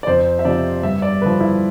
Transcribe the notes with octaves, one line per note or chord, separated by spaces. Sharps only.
D5
F2 C5
E5
C3 F3 D5
G2 E5
D5
D3 F3 B4
E4